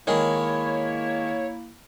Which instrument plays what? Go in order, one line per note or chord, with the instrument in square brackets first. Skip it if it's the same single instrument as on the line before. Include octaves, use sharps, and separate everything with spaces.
[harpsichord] D#3 G#3 [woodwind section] A#3 E4 [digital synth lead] C#5